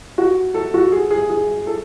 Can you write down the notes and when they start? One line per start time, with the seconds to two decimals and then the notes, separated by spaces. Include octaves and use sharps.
0.18 F#4
0.54 A4
0.74 F#4
0.92 G#4
1.11 G#4
1.30 G#4
1.67 A4